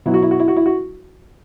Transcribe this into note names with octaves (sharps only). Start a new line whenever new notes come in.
B2 F#3 E4
F#4
E4
F#4
E4
F#4
E4
F#4